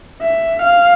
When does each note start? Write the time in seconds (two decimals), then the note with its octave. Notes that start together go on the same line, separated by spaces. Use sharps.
0.22 E5
0.62 F5